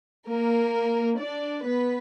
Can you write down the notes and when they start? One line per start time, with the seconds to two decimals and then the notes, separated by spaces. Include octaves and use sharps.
0.28 A#3 A#4
1.19 D4 D5
1.65 B3 B4